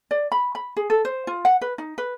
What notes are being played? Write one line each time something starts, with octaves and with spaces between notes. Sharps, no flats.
D5
B5
B5
G#4
A4
C5
F4
F#5
B4
D#4
B4